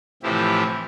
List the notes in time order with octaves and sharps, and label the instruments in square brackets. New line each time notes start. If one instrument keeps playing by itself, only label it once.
[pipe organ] A2 C3 E3 F3 E4 G4